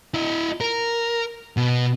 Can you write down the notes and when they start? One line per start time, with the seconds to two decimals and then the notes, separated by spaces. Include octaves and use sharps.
0.14 E4 D#5
0.61 A#4
1.57 B2